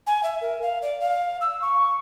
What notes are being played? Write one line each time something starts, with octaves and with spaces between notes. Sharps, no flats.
G#5
E5
A#4
F5
D5
F5
E6
C#6